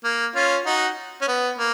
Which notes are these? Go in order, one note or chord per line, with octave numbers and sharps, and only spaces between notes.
A#3
C#4 F4
D#4 F#4
C#4
B3
A#3